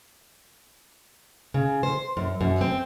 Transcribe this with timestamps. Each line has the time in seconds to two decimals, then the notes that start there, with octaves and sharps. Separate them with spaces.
1.54 C#3
1.83 C5
2.17 F#2
2.41 F#2
2.61 C4